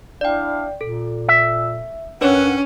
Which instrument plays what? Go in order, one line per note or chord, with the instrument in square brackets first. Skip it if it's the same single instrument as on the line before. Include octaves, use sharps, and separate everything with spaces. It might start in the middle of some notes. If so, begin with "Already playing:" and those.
[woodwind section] D4 E4 F5 [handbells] D5 G5
[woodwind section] A#2 [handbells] A4
[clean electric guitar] E5
[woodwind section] G2 A#4 F#5 [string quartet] C#4 [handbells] D4 B4 C#5